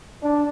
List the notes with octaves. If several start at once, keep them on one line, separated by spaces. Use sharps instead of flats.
D4